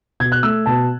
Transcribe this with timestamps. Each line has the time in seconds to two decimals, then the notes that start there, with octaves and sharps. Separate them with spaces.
0.20 B2 G#6
0.32 F#6
0.43 A3 E6
0.66 B2 A5